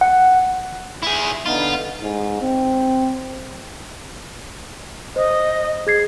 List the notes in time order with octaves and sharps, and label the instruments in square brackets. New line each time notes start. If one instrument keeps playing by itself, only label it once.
[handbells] F#5
[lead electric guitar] E4 G#4
[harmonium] D3 B3 D#4 [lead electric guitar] F4
[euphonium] G#2
C4
[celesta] C5 [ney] D#5
[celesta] G#4 G#6 C7